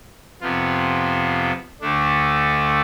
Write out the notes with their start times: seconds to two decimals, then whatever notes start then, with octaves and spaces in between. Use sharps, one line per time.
0.41 F2 C3 F3 B3 F4
1.81 D2 D3 A3 D4